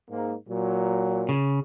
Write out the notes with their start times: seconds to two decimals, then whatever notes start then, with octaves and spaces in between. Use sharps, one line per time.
0.10 G#2 A#3
0.48 A#2 F#3
1.29 C#3